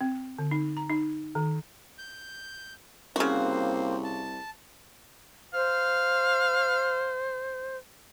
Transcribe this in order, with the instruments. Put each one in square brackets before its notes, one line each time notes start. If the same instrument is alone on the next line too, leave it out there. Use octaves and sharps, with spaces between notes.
[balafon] C4
D3
D#4
A#5
D#4
D#3
[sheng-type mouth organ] G6
[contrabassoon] C2 [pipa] C#3 F#4 [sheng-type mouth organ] A#3 C4 C5
[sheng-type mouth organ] A5
[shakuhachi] C5 [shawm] F5